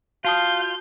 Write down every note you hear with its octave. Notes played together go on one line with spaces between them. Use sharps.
F4 F#4 F5 A5 D#6 G6